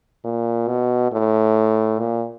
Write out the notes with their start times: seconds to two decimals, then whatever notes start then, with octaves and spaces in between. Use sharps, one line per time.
0.24 A#2
0.68 B2
1.12 A2
1.99 A#2